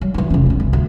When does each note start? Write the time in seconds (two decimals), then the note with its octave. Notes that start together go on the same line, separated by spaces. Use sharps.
0.01 F#3
0.14 E3 D#4
0.30 F1 C#4
0.46 G#3 B3
0.60 C2
0.73 D2